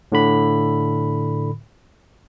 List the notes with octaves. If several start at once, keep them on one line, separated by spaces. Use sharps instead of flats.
A2 D3 B5